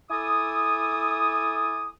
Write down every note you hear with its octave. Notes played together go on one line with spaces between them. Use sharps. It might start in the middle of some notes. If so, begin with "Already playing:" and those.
E4 A4 G#5 D6 D#6